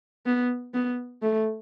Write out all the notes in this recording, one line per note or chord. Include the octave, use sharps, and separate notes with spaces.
B3
B3
A3